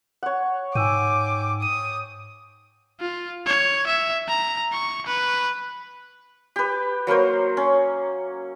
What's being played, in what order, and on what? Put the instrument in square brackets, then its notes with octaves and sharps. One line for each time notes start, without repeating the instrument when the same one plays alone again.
[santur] C#5 F#5
[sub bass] G#2 [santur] G5 [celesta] G#5 E6 D#7 [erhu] D6
[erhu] D#6 [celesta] D#7
[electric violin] F4
C#5
E5
A#5
C#6
B4
[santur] G4 B4
F#3 A#3 A#4 C5
C#4